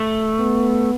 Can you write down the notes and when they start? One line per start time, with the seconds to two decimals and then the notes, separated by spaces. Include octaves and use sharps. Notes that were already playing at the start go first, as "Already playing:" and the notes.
Already playing: A3
0.39 B3